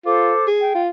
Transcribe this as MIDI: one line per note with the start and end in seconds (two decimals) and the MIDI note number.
0.05 0.32 65
0.05 0.45 69
0.05 0.45 72
0.05 0.45 86
0.47 0.72 68
0.60 0.81 79
0.75 0.89 65